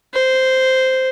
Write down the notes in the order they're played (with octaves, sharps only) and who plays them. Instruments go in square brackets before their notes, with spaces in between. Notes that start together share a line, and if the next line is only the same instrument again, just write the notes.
[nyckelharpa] C5